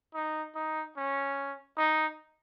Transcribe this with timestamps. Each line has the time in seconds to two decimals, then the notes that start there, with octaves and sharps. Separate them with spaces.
0.14 D#4
0.55 D#4
0.97 C#4
1.78 D#4